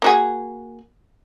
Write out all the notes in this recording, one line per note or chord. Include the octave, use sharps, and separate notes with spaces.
A#3 F#4 G#4